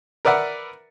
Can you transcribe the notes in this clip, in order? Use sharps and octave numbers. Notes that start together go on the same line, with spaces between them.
A#4 B4 D5 E5 F#5